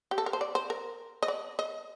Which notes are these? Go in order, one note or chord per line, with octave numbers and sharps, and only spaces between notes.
G4
A4
A#4
C5
D5
C5
A#4
D#5
D5
D#5